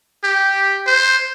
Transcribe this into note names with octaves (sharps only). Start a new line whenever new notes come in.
G4
C5